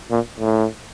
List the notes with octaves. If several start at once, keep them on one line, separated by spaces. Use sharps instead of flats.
A#2
A2